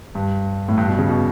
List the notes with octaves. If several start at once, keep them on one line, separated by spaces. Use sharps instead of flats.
G2
A2
G2
B2
C#3
B2